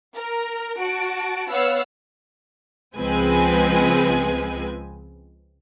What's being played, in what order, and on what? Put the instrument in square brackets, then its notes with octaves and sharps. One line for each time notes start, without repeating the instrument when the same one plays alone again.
[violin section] A#4
F#4 A5 D7
B3 C#5 F5 F#5 E6
[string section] C#2 F3 G#3 C4 B4 G#5